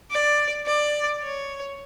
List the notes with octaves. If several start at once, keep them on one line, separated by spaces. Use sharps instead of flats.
D5
D5
C#5